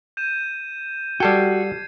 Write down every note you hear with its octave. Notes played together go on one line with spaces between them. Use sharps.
G6 D#7 E7
G3 F#4 A4 G5 G#6 C7